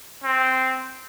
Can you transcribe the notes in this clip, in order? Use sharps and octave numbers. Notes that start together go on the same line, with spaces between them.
C4